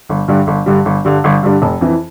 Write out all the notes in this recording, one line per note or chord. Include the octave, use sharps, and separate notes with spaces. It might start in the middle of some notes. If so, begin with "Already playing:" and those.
G1
G2 D3 G3
G1
G2 D3 G3
G1
G2 D3 G3
G1
G2 D3 G3
F1
F2 E3